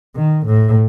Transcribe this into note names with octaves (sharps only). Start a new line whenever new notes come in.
D#3
A2